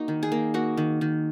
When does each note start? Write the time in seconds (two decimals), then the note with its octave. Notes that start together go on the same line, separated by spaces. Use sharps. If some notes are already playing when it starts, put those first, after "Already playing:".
Already playing: A#3 D#4 F#4
0.08 D#3
0.23 G#4
0.32 A#3
0.54 A#3 F#4
0.77 D#3
1.01 D#3